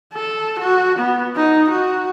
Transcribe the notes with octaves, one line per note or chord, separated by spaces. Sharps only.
A4
F#4
B3
D#4
F#4